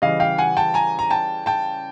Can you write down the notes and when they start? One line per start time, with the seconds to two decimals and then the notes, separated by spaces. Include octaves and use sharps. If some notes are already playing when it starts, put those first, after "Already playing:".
0.02 C#3 E3 G3 D#5 F5
0.20 F5 G5
0.38 F#5 G#5
0.57 G5 A5
0.74 G#5 A#5
0.99 A#5
1.10 G5 A5
1.46 G5 A5